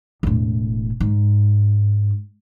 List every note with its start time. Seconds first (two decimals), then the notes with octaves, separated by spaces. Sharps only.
0.23 E1 A2
1.00 G#2